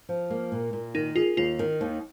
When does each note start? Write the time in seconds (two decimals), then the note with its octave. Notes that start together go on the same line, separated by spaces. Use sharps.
0.09 F3
0.30 A#3
0.52 A#2
0.73 A#2
0.95 D#3 D#4
1.16 F4 G#4
1.37 D#2 F4
1.59 D#3
1.81 D#2